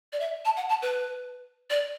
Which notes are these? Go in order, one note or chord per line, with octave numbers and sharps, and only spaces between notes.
D5
E5
A5
F#5
A5
B4
D5